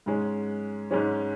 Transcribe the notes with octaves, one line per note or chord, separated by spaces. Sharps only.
G#2 G#3 C#4
G#2 G#3 C#4